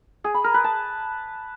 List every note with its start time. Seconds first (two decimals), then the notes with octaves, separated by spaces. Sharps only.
0.24 G#4
0.34 B5
0.44 A#4
0.54 B4
0.64 A5